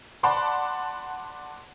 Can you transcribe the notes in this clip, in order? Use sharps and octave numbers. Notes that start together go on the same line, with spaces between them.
D5 F#5 A5 B5 C6 D6